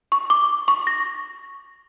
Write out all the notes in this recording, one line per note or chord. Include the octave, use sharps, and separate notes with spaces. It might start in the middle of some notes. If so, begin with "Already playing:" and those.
C#6
D6
C#6
A#6